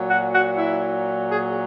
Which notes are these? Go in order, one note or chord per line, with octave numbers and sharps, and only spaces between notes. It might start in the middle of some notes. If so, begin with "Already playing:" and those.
Already playing: A#2 F#3
F#4
F#4
E4
G#4